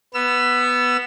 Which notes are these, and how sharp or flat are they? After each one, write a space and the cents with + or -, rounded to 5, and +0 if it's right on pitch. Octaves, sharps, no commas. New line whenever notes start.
B3 +0 E6 +30